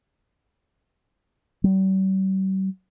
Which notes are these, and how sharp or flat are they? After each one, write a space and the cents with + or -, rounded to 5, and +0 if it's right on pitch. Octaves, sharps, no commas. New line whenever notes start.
G3 -45